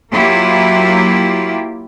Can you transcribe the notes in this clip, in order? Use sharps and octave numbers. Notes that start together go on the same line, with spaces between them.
F#3 A#3 E4 F4 G4